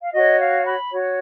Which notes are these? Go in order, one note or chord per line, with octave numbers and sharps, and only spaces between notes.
F5
F#4 C#5 D#5
F5
B5
F#4 C#5